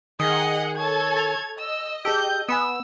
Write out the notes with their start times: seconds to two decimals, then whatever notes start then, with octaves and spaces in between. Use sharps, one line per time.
0.20 D#3 G#4 D#5 F#5 D#6
0.77 A4 C#5 A5 G#6
1.17 A6 F7
1.59 D#5 E6
2.05 G4 G#4 A5 E6 G6
2.49 B3 G#5 B5 D#6 E6